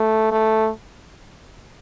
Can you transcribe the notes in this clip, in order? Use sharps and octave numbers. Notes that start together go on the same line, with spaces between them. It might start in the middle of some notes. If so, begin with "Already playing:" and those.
Already playing: A3
A3